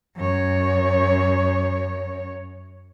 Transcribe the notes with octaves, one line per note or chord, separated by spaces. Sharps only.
F#2 C#5